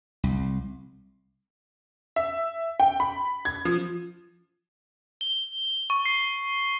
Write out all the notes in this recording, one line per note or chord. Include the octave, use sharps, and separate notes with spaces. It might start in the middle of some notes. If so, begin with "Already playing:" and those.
C2
E5
G5
B5
G#6
F3
G7
C#6
C7